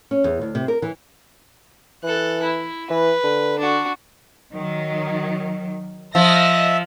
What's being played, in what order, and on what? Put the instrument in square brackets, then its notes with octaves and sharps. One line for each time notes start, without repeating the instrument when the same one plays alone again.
[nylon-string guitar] C#4
E2
D2
C3
A#4
E3
[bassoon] E3 [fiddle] A4 F#6
[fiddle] E4
[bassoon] E3 [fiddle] B4
[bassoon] D3
[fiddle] D4 F#4
[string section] D#3 F#3
[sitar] F3 [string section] D#5 A#6 [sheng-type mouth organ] E5